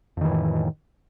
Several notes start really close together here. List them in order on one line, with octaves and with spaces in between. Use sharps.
F2 D#3 E3 A2